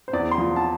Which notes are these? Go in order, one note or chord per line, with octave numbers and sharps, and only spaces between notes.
C5
E2 D5
C6
F3
A5